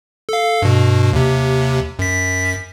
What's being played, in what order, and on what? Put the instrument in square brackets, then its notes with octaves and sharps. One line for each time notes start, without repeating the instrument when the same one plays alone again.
[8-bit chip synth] A4 F5
G2 B2
D#2 C3
F#2 B6